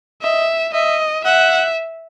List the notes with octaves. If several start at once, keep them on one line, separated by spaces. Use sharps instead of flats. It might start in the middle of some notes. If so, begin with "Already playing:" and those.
D#5 E5
D#5 E5
E5 F#5